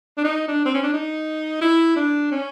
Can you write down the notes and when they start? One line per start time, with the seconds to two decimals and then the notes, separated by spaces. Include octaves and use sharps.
0.17 D4
0.24 D#4
0.48 D4
0.66 C4
0.74 C#4
0.83 D4
0.93 D#4
1.61 E4
1.96 D4
2.31 C#4